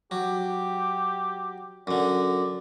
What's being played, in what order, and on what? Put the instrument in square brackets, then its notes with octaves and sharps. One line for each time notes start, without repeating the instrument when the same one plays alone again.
[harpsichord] F#3 [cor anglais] G4
[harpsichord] F#2 D3 [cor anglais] D5